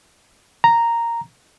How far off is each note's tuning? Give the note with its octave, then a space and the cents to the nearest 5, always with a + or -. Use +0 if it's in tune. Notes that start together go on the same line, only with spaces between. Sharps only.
A#5 -5